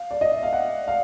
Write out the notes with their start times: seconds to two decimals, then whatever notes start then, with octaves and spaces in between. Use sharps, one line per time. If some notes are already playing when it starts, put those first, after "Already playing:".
Already playing: F5
0.11 D5
0.21 D#5
0.32 E5
0.43 F5
0.53 F#5
0.88 F5